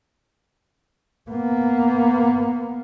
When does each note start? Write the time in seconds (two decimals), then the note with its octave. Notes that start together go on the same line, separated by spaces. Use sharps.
1.31 A#3 B3